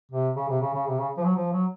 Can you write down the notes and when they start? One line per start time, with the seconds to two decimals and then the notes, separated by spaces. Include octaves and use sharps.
0.12 C3
0.36 C#3
0.49 C3
0.61 C#3
0.73 C#3
0.87 C3
0.99 C#3
1.17 F3
1.24 F#3
1.36 F3
1.53 F#3